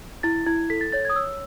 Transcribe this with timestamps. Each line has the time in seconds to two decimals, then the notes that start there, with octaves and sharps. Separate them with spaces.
0.23 E4 A6
0.46 E4 G#6
0.70 A4 B6
0.81 A6
0.92 C#5 A6
1.05 D#6 G#6
1.16 C#5 E6